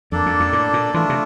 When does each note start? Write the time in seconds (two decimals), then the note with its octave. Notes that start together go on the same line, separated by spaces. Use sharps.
0.12 F2 A#3 D4 A4 D5
0.26 F2
0.40 F2
0.53 A2
0.73 A#2
0.94 E3 A3 D4 F4
1.09 C3